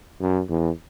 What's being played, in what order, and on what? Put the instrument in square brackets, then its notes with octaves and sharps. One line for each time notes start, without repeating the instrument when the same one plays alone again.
[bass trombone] F#2
E2